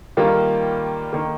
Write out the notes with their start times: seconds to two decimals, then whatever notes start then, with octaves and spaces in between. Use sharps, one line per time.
0.17 D#3 G3 A#3 F4
1.13 D#3 A#3